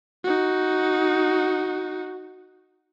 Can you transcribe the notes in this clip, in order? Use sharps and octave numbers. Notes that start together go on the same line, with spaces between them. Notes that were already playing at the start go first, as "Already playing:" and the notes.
D#4 F#4